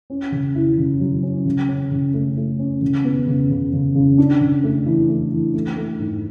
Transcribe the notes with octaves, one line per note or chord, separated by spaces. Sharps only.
C#4
C#3
E4
C#3
F#3
C#4
C#3
C#4
C#3
A3
A3
C#4
C#3
B3
C#3
C#3
C#3
C#3
D4
C#3
A3
E3
A3
E3
A3
A3
G#2